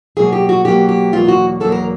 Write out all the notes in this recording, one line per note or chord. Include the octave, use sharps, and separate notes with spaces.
B2 F#3 A#3 G#4
G4
F#4
B2 F#3 A#3 G4
G4
E2 B2 F#3 A#3 F4
F#4
E2 B2 F#3 A#3 A4
A#4